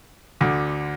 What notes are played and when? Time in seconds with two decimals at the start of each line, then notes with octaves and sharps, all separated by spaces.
0.41 D2 D3